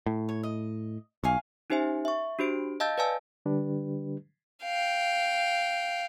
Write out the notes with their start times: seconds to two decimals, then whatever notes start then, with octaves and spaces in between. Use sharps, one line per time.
0.06 A2
0.29 C#5
0.43 D#5
1.24 B1 F5 G#5 C#6
1.70 C#4 D#4 G4 C5 E5 G#5
2.05 E5 C#6
2.39 D4 F#4 G4 C5 D7
2.80 D#5 F5 A5 E6 G6 A6
2.98 B4 D5 F5 G#5 A5 E6
3.46 D3 G3 D4 G4 B4
4.64 F5 G5